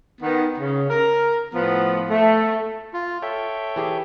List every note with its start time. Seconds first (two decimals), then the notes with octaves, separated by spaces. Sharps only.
0.21 D#3 B3
0.58 C#3
0.90 A#4
1.53 A2 F3 B3
2.09 A3
2.94 F4
3.22 A4 C#5 E5 G5
3.76 E3 G4 G#4